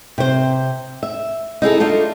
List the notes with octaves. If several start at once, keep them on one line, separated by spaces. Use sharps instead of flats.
C3 C5
E5
D#4 E4 G#4 A4
D4 D#4 F4 A4